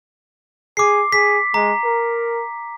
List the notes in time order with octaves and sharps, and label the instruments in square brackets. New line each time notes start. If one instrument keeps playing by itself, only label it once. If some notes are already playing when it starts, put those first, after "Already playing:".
[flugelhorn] G#4 [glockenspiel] D6 C7
[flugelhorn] G#4 [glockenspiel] B6
[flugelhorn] G#3 [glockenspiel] A#5
[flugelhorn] A#4